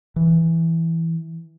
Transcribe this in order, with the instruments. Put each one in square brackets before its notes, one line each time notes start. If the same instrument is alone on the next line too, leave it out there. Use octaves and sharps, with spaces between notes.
[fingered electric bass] E3